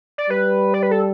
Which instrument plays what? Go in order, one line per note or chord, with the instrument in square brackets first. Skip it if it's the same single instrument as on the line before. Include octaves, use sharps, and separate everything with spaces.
[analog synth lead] D5
[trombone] G3 [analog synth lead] B4
[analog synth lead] D5
B4
A4